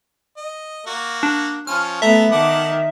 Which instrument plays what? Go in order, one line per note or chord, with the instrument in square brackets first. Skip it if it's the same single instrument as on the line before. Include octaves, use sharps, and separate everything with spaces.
[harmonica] D#5
A#3 F#4
[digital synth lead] D4
[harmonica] F3 C#4 [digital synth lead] F6
[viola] A3 B3 [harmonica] A4 A#5 [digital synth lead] E5
[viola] D#3 [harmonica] F#5 A5 D6